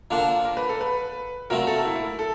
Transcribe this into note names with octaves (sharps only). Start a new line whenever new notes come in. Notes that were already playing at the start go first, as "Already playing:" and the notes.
D3 F3 A#3 D4 F4 A4
A#4
B4
A4
B4
A#2 F#3 A3 C4 A#4
A4
E4
E4
A4